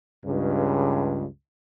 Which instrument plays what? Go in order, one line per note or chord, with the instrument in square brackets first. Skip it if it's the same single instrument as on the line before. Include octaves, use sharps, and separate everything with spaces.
[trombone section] C#2 G2